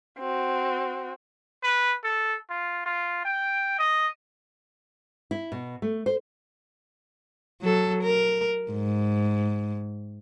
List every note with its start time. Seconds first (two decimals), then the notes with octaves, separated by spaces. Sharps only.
0.19 C4 F#4
1.64 B4
2.04 A4
2.50 F4
2.86 F4
3.25 G5
3.79 D#5
5.31 E4
5.52 B2
5.82 A3
6.06 C5
7.62 F#3 A4
8.03 A#4
8.72 G#2